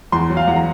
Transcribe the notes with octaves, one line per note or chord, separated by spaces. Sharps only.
E2 C6
F#3
F5
E2 F#5
A#5